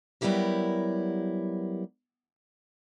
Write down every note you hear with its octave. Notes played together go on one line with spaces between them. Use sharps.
F#3 G3 B3 E4 G4 A#4